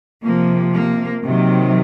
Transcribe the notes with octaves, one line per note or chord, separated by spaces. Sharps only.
C3 F3 A#3
A#3
C3 D#3 F#3